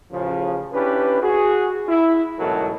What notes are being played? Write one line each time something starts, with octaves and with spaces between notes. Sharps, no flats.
A1 C#3 F3
C#4 D4 E4 G4 B4
F#4 G#4
E4
A1 G#2 B2 F#3 A4 A#4